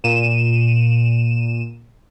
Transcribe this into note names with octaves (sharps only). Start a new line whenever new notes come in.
A#2 D#7 E7